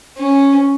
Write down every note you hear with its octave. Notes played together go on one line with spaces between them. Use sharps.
C#4